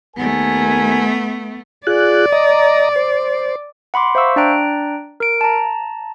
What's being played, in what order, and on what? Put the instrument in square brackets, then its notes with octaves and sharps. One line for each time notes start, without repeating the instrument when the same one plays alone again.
[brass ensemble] D#2 A#4 G#5 [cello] A3 B3
[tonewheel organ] F4 G#4 F#6 [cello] D5
[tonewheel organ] D#5 A#5
C5
[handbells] F#5 B5 C6 D6
C5 E5 F5 C#6 E6
D4 D5 G5 A#5 F#6 D7
A#4 D7
A5 A#5